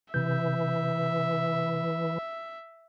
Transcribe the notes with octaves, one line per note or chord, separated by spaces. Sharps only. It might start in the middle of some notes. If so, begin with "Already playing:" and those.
C3 E3 E5 G6